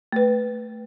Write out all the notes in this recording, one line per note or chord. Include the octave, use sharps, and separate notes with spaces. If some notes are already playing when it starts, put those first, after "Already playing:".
A3 B4